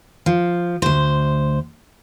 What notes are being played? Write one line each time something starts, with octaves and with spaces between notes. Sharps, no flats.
F3
D2 C5